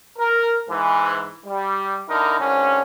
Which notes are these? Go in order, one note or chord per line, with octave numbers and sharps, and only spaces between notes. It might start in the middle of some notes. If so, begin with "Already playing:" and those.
A#4
G#2 E3
G3
D3 D#4 E4 A#4
G#1 D3 C#4